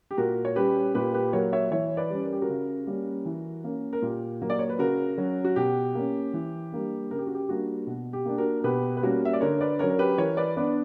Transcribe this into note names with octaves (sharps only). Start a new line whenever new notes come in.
G4
A#2 F#4 A#4
C#5
G3 C#4 G4 B4
A#2 G4 B4
G4 B4
F#3 A#3 A#4 C#5
C#5 E5
E3 C#5 E5
B4 D5
G3 C#4
A#4
G4
F#4 A#4
C#3
G3 A#3 C#4
E3
A#3 C#4
A#4
A#2 G4
F#3 A#3
D5
C#5
B4
C#3 F#4 A#4
F#3 C#4
F#4
B2 G4
A#3 C#4
E3
G3 A#3 D4
C#3 A#4
G4
F#4
G4
G3 A#3 D4 F#4
B2
G4
A#3 D4
F#4 A#4
A#4
B2 G4 B4
B4
G3 A#3 C#4 F#4 A#4
E5
D5
D3 A#4 C#5
B4 D5
F#3 C#4 A#4 C#5
A#4
G4 B4
E3 A#4 C#5
B4 D5
B3 D4 B4 D5